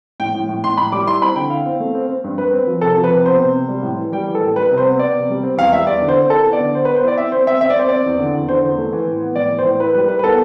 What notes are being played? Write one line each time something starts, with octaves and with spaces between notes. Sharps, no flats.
A2 G5
A2
A2
A2 C6
A2 B5
G3 D6
E4 C6
C4 B5
D3 G5
E4 F5
C4
A3
C4
C4
G2
G2 B4
C4
F3
C3 A4
F3
B4
C3
B3 C5
C3
C3
G3
A2
E3
G3 G5
E3
A4
A2
G3 B4
C3
C5
B3
B3 D5
C3
G3
C4
E2 F5
G3 E5
E2 D5
D3
C5
C4
E4 A4
B3
D5
D3
B3 C5
B4
B3
C5
E4 D5
C4 E5
C4 C5
C4 E5
C4 E5
D5
C4 C5
C4 D5
E2
D3
E2
D3 C5
E2
A3
E3
A2
B3
A2 D5
E3
C5
A2
E4 B4
G3 B4
E4 B4
B4
B3 A4